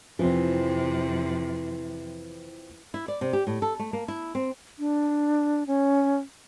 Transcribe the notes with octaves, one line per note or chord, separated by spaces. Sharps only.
F2 C3 E3 F3 C4
E4
D5
C3
G4
A2
A4
A3
A#3
E4
C4
D4
C#4